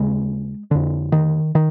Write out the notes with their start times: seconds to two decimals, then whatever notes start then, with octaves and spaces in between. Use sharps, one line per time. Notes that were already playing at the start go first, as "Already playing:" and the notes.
Already playing: D#2 C#3 G#3
0.71 F2 D3
1.12 D#3
1.55 D#3